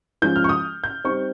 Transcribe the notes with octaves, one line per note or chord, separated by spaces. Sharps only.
F3 G#3 C#4 F4 G6
F6
C#6
D#6
G6
G3 C4 D#4 C#6